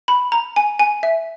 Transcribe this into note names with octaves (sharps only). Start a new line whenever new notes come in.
B5
A#5
G#5
G#5
E5